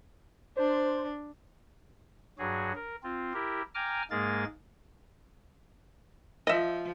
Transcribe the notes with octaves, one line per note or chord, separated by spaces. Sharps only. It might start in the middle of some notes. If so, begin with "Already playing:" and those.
D4 C5
G2 F#3 F#4 G#4
A#4
C4 F4
E4 G4 A#4
G5 G#5 A#5 D6 F6
G#2 G#3 A#3 G#4 A#4 A6
F3 D#5 E5